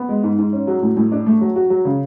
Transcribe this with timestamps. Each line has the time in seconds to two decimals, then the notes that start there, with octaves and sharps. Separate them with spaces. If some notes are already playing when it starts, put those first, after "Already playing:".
Already playing: B3
0.09 G#3
0.24 G#2
0.38 G#2
0.53 C#4
0.67 F#3
0.82 A2
0.97 A2
1.12 D4
1.26 A3
1.41 F#3
1.56 F#4
1.70 F#3
1.85 C#3